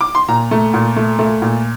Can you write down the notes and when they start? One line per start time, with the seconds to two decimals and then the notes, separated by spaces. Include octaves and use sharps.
0.01 D6
0.15 C6
0.28 A#2 A#5
0.51 A3
0.74 A#2
0.96 A3
1.19 A3
1.42 A#2